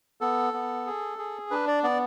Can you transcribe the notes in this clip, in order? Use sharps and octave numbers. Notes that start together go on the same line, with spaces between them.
B3 A4
B3
G#4
G#4
D4 B4
D5
B3 D5